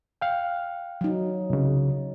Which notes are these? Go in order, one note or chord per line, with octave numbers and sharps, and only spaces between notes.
F5 G5
F#3 D#4
C2 C#3